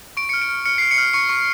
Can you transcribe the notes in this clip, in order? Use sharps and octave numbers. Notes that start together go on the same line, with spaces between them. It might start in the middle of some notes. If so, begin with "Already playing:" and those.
C#6 D7
F6 C#7
D7
F6
F6 C#7
F6 C7
C#7
F6
C#6 C#7
C#6